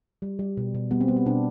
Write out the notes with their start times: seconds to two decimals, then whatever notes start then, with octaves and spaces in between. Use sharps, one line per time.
0.22 G3
0.39 G3
0.57 B2
0.74 B2
0.91 G3 B3
1.01 C4
1.08 G3 B3
1.17 C4
1.26 B2 D4